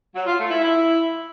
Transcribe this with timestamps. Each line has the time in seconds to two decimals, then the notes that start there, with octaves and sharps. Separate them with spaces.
0.15 F#3
0.26 F4
0.38 A3
0.50 E4
0.62 E4